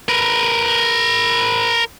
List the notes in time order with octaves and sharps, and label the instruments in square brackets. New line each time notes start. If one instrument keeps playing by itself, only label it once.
[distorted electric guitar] A#4 B4